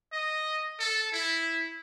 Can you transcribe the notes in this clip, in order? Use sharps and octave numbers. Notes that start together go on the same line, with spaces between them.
D#5
A4
E4